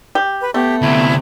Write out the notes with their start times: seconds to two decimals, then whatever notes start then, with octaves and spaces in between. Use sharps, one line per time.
0.15 G4
0.41 B4
0.54 A3 B3 G4
0.82 D2 C3 E4